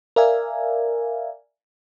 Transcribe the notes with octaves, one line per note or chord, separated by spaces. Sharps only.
A#4 D5 E5 F5 G#5